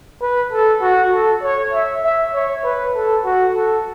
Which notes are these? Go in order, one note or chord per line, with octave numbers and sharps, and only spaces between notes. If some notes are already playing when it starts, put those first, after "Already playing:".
B4
A4
F#4
A4
C#5
E5
E5
C#5
B4
A4
F#4
A4